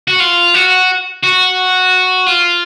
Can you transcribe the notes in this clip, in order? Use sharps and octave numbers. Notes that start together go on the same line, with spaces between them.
F#4
F4
F#4
F#4
F4